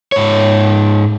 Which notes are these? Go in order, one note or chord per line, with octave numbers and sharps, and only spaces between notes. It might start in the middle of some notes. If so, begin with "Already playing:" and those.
G#2 C#5